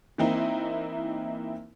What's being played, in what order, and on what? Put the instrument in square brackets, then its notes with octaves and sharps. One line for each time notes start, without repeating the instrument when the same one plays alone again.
[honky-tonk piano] E3 A#3 C4 D#4 E4